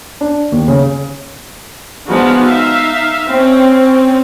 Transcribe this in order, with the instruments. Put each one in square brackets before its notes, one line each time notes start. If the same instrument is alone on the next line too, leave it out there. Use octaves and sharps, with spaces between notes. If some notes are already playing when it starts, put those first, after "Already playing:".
[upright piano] D4
D#2
C#3
[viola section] F3 G#3 B3 D4 D#4 F#4
D#4 E5 F5
C4 C#4